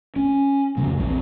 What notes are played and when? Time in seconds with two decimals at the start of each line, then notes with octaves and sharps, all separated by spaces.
0.16 C#4
0.77 F1 D2 C#3 A#3
0.97 A#1 E2 F3 C4